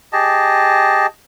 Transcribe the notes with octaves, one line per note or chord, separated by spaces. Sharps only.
G4 G#4 D#5 A5